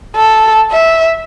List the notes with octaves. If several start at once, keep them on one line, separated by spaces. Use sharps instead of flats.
A4
E5